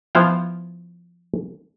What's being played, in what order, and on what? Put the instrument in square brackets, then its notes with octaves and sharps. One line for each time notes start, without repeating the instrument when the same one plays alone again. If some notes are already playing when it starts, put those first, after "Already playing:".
[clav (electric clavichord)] F3 B3 E4 C5 F5 G5